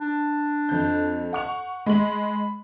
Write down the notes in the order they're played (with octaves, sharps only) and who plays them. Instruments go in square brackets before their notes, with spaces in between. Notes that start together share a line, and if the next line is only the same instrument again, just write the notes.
[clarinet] D4
[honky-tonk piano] F2 G6
F#5 C#6 F7
[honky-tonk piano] G#3 F#7 [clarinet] B5